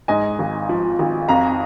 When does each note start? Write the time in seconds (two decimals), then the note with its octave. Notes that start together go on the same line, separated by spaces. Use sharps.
0.08 G#2 D#5 G#5
0.39 G#1
0.69 F3
0.99 G#1
1.28 F2 F5 A#5